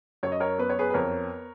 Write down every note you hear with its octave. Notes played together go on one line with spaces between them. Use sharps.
F#2 C#5
D#5
A#4 C#5
B3 B4
C#5
G#4 B4
B4
F2 A#4 C#5